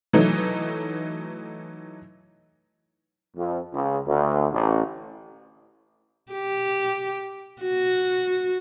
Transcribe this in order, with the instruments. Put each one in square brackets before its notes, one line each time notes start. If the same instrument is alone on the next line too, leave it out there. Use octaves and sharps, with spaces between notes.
[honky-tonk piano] E3 F#3 A3 D#4
[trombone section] F2
C#2
D2
A1
[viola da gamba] G4
F#4